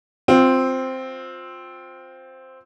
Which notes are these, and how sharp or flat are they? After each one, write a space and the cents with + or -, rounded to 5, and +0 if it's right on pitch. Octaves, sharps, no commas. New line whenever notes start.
C4 +0 F4 +20